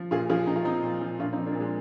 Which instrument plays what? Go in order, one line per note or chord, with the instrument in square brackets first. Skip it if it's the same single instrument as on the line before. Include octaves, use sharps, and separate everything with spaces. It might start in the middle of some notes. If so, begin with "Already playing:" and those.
Already playing: [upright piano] F3
A#2 F4 G#4
F3 F4 G#4
A#2 D#4
F4
F3 C4 D#4
A#2
F3
A#2 D4 F4
C4 D#4
F3
A#3 D4
A#2 G#3